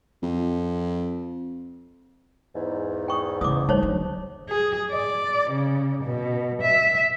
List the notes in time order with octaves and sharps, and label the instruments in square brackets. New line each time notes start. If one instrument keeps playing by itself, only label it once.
[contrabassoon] F2
[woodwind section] E2 G#2
[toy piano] G5 C#6 D#6
[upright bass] C#3 E3 [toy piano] D6 D#6
[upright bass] G3 [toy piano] D#4 C5 C#5
[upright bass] D3 F#3
[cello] G#4
D5
C#3
B2
E5